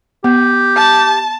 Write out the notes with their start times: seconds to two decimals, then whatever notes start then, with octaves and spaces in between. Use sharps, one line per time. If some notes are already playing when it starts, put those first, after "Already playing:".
0.24 B3 G4
0.76 A5